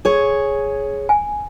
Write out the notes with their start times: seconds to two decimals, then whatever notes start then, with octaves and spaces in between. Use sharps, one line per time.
0.05 G#4 C#5
1.09 G#5